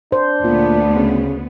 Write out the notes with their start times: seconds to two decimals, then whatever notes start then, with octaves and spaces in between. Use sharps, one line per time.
0.12 D4 C5
0.44 D2 A#2 B3
0.96 C#3